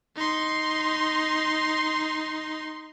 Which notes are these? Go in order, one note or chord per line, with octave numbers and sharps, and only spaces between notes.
D#4 C6